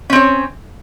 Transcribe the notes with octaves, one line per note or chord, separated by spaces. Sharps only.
C4 C#4 C#5